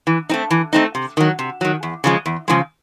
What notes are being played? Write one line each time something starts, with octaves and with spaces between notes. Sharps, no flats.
E3
A3 C4 D#4
E3
A3 C4 D#4
C3
D#3 F#3
C3
D#3 F#3
E2
C#3 F3 G#3
E2
C#3 F3 G#3